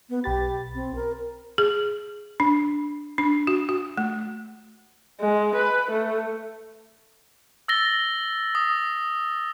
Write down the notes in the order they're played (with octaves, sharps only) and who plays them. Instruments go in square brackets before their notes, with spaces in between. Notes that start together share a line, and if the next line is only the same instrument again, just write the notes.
[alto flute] B3
[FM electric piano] B1 B5 A6 [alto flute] G4
[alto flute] C4
A#4
[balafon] G#4
D4
D4
F#4
F#4
A3
[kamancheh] G#3
B4
A3
[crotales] E6 A6 A#6 G7
D#6